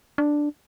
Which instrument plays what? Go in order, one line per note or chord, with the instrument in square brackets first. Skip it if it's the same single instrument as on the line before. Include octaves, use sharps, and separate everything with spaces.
[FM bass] D4